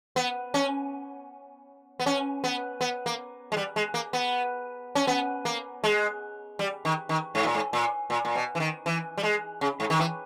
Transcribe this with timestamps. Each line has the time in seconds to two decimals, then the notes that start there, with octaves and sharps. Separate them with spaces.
0.16 B3
0.54 C#4
2.00 B3
2.06 C#4
2.44 B3
2.81 B3
3.06 A#3
3.52 G#3
3.57 G3
3.76 G#3
3.94 A#3
4.13 B3
4.95 C#4
5.07 B3
5.45 A#3
5.84 G#3
6.59 G3
6.85 D#3
7.09 D#3
7.35 G#2
7.45 A#2
7.55 G#2
7.73 A#2
8.10 A#2
8.25 A#2
8.35 B2
8.55 E3
8.60 D#3
8.86 E3
9.17 G3
9.23 G#3
9.61 C#3
9.80 G#2
9.90 D#3
9.99 E3